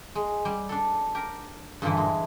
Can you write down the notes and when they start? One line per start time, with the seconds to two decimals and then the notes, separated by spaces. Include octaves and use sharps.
0.15 G#3
0.45 G3
0.69 D4 A4
1.15 G4 A#4
1.82 G2 A#2 D3 E3
1.97 G#3